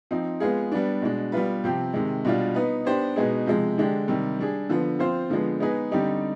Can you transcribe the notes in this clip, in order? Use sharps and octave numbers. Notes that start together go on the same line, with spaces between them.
F3 C4 D#4
G#3 B3 F4 G#4
G3 B3 D4
B2 G#3 D4
G3 B3 F4 B4
C3 F3 C4 G4
C3 D#3 G#3
B2 G3 D4 F4
B3 D#4 B4
B3 D4 G4 C5
B2 G#3 B3 D#4 G#4
C3 F3 G#3
D3 G#3 D4 G4
C3 D#3 G3
G3 D4 G#4
D3 F3 B3
F3 C4 F4 C5
D3 F3 G#3 B3
G#3 B3 D#4 G#4 B4
D3 G3 C4 D#4 G4